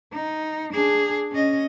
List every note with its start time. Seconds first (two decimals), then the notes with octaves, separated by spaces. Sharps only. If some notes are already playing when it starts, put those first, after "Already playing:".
0.13 D#4
0.73 D4 G#4
1.32 C#4 D#5